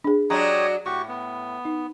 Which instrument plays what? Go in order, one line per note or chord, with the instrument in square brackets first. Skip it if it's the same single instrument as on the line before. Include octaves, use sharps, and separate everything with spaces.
[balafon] D4 G#4
[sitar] F#3 G#3 D4 [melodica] G4 C#5 D#6 [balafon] A#5
[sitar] A2 [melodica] F#4 G4 C#6
[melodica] B3
[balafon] D#4